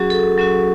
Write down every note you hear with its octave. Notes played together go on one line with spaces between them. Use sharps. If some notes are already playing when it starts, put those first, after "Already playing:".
Already playing: F#3 C#4 F#4 G#4
A4
F#3 C#4 F#4